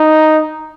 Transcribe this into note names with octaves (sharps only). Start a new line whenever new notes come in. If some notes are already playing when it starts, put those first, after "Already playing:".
Already playing: D#4